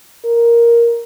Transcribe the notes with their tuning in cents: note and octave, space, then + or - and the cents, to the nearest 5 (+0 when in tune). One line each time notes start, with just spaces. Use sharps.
A#4 +5